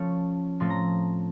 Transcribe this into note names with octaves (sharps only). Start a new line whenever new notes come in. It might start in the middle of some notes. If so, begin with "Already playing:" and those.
Already playing: F3 A3 C#4 C#6
A2 F3 A3 C4 C6
A#5